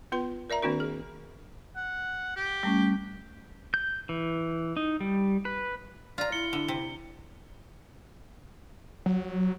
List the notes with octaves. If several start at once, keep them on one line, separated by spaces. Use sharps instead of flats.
B3 F4 B4 C6
A#4 D5 E5 A#5
D#3 A#3 C4 D4 F#4 A#4
G#4
F#5
G4
G3 A3 C#4
G6
E3
D#4
G3
B4
F4 D5 A#5
E4 C#7 G7
D3
C3
F#3